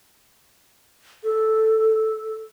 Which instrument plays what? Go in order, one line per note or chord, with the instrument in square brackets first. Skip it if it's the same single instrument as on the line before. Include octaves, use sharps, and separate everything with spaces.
[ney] A4